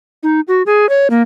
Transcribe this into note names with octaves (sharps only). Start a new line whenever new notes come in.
D#4
F#4
G#4
C#5
A#3